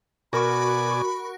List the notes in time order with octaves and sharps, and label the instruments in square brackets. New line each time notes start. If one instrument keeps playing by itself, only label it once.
[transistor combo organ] B2 D5 G#5 [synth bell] F#4 A#4 C#6 [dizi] B5